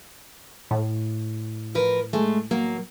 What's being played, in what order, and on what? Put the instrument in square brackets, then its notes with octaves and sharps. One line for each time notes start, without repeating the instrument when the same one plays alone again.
[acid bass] A2
[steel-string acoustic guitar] F3 A#4 B4
G#3 A3
F#3 A#3